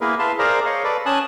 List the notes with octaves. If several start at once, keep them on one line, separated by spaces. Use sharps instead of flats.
A#3 B3 E4 G#4 A#4 B4
B4 E5 F5 A5 C6
G#4 A#4 C5 D5 F5 A#5
C#5 D#5 F5
A4 B4 D5
C#4 G#5 A5 D#6 F#6